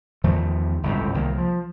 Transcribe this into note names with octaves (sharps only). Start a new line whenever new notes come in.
E2 D#3 F3 A3
G1 C#2 A2 C3
C2 D#3 F3 A#3
F3